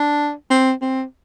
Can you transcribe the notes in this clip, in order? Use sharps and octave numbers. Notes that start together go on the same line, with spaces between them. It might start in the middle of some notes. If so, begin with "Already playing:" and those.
Already playing: D4
C4
C4